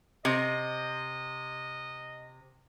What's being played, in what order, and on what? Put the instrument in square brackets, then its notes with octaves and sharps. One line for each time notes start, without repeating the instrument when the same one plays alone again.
[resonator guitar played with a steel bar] C3 [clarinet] D#5